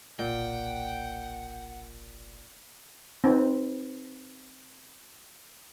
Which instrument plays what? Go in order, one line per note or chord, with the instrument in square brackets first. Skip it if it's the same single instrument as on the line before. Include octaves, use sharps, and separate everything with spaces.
[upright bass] F#1 B1 [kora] A#2 [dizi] F#5 [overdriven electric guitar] G5
[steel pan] C4 D#4 B4